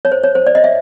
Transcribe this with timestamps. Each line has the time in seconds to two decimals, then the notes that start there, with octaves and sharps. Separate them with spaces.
0.05 C#5
0.12 C5
0.23 C#5
0.35 C5
0.47 D5
0.55 D#5
0.64 E5